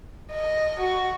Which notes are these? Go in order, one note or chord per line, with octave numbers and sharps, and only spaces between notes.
D#5
F#4